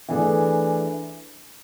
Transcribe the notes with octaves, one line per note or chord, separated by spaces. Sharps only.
E3 A3 D4 G#4